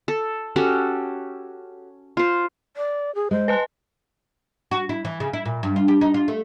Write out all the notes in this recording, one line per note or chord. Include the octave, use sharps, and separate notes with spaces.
A4
C#4 F#4 G4 A4
F4 C5
D5
G#4
G#3 C5
B4 D#5 A5
F#4
E4
E3
C#3
E4
A#2
G2
F4
G4
D#4
F4
A3